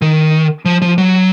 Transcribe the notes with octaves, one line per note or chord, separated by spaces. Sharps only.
D#3
F3
F3
F#3